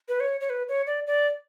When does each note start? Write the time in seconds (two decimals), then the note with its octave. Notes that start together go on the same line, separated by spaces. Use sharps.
0.09 B4
0.20 C#5
0.41 C#5
0.50 B4
0.69 C#5
0.87 D5
1.07 D5